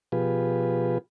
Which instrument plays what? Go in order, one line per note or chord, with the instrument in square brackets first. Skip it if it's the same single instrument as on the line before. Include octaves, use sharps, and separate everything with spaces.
[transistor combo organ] B2 F3 F4 G4 G#4 B4